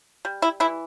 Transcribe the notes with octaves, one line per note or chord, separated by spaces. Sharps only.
G3
E4
E3 E4